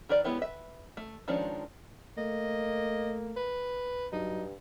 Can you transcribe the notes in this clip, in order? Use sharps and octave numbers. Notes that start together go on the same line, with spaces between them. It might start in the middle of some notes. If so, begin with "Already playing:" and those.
D#3 A#4 B4 D5
G#3 B3 E4 G4 C#5
B4 E5
A3
D#3 F3 G#3 C#4 D4
A3 A#3 D#5
B4
G2 F#3 D#4